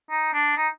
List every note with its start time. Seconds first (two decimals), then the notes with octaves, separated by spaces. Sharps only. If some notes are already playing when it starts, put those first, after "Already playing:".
0.10 D#4
0.34 D4
0.57 D#4